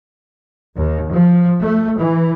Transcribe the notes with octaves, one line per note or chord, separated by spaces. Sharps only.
D#2
F3
A3
E3